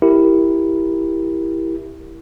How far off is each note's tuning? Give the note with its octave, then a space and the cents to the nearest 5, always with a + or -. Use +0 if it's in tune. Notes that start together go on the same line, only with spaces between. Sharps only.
E4 +0 G4 +0 A#4 +0